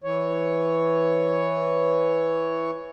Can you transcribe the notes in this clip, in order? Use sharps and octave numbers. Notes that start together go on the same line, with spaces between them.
E3 C#5